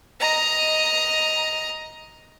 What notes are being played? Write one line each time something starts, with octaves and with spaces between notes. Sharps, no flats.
D#5 A#5